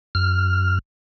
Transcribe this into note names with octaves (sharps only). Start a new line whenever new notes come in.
F#2 F6